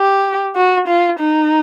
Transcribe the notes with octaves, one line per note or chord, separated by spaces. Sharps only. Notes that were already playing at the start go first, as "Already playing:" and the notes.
Already playing: G4
F#4
F4
D#4